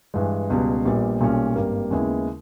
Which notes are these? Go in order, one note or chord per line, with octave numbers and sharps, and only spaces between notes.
G2 E3 G#3
C#2 B2 G3
A#1 A#2 G3 B3
B1 A#2 G3 C#4
G#1 G2 G3 A#3
D#2 C#3 G#3 B3 E4